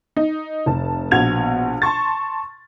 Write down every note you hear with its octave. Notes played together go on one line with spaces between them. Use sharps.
D#4
F1 A5
A#1 B2 F#4 G#6 F7
A5 C6 C#6 A6